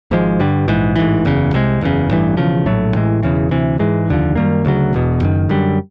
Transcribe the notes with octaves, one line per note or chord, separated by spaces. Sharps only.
G#1 G#2 F3 G#3
G2 D3 G3
A#1 G#2 E3
A1 G#2 E3
F#1 E2 C#3
C2 C3 D#3 G#3
F#1 E2 C#3
A1 G2 E3
E1 E2 C#3 F3
A#1 A2 F#3 A3
A1 A2 E3 G#3
E1 E2 C#3 E3
D2 C3 E3
G#2 E3 G#3
F1 D#2 D3 F3
F#2 D#3 G3 A#3
D2 C#3 F#3
E1 E2 B2
F#1 F#2 D#3
F#2 D3 G3